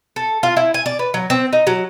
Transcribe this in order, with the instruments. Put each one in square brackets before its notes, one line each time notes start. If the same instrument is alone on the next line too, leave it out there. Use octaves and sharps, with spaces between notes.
[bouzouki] A4
F4
E4
G#5
D5
B4
F#3
C4
D#4
F#3